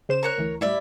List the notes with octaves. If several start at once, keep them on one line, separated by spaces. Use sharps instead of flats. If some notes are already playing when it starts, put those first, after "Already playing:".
C#3 C5 E7
A#4 C#5 F#6
D2 E3
A2 G3 E4 D5 E5